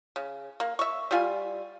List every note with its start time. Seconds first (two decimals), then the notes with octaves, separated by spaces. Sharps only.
0.16 C#3
0.60 A#3
0.79 E5 C#6
1.11 G3 F4 G#5